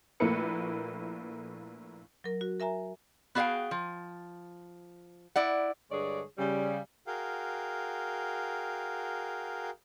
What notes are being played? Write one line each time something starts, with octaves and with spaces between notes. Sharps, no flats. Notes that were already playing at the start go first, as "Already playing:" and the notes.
A#1 A3 A#3 E4 B4 C#7
F#3 A#4
F#4
A#4 E5 G#5 A#5
B3 F#4 G#4 E5 F5 G5
F3
E4 D5 F#5
G2 D3 G#3 G#4 C#5 D5
C#3 G3
F#4 G#4 A#4 F5 G5